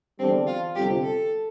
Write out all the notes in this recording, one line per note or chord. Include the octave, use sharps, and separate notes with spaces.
E2 D3 G3 C4 D4
F4
G1 F2 C3 G4
A4